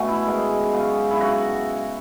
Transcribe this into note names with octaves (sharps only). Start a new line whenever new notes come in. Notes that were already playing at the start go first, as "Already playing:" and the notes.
Already playing: B2 A3 B3 C#4 F#4
E4
D#3 G#3 B3
F#2 C#3 G#3 C#4
E4
C#3 F#3 F#4